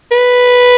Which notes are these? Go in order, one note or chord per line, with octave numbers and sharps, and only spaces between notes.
B4